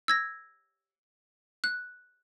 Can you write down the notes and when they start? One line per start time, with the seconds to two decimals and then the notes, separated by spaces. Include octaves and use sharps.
0.08 E6 G#6 A#6
1.64 F#6